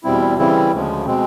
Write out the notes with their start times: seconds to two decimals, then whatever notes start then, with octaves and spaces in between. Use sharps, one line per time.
0.03 E2 B2 G3 C4 E4
0.38 C#3 E3 G3 C4 E4
0.72 D2 C#3 F3 G#3
1.06 B2 G#3 C4